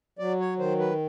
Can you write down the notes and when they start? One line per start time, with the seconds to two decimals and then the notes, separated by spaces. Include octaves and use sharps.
0.19 F#3 D5
0.40 C#5
0.59 D#3 C5
0.79 B4